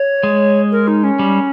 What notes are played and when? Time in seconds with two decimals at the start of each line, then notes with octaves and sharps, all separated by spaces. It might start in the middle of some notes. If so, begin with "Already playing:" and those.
Already playing: C#5
0.23 G#3
0.71 A#4
0.87 D#4
1.03 C#4
1.19 G3